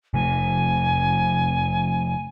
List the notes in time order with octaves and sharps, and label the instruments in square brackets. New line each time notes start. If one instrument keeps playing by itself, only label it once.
[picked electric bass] C3 F3 A3 [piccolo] G#5